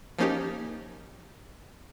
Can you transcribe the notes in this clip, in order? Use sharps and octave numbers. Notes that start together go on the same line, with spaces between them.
F3 A#3 C#4 D#4 G4